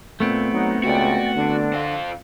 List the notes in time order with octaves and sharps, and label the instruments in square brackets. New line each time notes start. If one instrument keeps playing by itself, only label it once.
[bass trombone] A#2 [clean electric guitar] A3 B3 C4
[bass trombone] F#3 [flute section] D#4 F#5
[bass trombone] C#2 [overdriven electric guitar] F#4 [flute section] D5 G5
[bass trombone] D3 [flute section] D4
[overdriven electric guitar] C4 F4